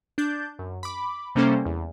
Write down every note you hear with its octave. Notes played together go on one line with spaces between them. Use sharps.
D4 G6 A6
F#2
B5 D6
C3 G3 A#3 C#4 A4 C5
E2